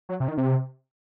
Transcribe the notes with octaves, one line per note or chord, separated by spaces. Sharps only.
F#3
C3
D#3
C3